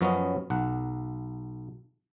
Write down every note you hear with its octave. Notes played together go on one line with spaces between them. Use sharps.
F#2 F3 F#3 B3 C#4 D#5
B1 F#5